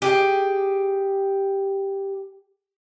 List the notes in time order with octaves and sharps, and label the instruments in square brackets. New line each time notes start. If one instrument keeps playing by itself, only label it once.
[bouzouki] G4 G#4